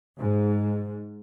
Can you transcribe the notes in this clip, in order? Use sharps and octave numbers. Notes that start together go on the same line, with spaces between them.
G#2